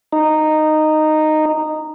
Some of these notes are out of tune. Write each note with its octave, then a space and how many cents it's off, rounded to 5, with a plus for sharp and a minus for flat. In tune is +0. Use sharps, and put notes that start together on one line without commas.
D#4 -10